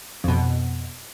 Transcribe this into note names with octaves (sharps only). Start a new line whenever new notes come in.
F2 B2